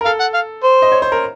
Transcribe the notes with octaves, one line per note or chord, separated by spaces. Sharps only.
A#4
A4 F5
F#5
F5
C5
D#5
C#5
C5
A#4